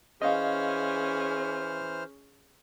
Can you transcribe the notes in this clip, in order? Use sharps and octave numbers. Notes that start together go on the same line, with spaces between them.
E3 C#4 G#4 C5 D#5 F5 F6